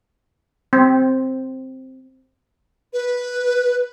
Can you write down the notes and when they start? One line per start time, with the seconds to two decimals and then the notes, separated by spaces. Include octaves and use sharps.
0.73 C4
2.93 B4